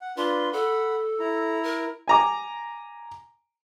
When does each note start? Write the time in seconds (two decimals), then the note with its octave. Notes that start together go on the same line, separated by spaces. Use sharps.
0.02 F#5
0.17 D4 F4 B4 C6
0.53 A4 F#5 B5
1.20 E4 A#5
1.64 A#4
2.08 G#5 A#5 D6